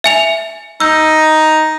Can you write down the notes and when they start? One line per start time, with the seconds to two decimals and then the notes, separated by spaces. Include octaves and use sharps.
0.04 E5 G#5 F7
0.80 D#4 E6 G6